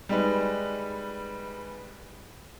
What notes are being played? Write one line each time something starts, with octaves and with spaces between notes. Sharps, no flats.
G3 G#3 D#4 B4